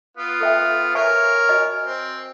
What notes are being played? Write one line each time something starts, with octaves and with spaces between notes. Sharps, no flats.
B3 F4
A4 E5 G5
A#4 C#5 E5 G#5 C#6
F#4 D#5 G#5
C4